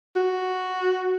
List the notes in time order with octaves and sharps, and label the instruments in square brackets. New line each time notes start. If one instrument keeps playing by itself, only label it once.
[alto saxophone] F#4